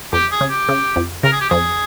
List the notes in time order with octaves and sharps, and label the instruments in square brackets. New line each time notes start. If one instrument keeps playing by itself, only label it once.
[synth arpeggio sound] F2 [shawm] G4
[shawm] G#4
[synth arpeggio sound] C#3
[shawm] G4
[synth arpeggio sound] C#3
F2
[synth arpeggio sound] C#3 [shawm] A#4
[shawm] G#4
G4
[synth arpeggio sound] F2 [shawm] G#4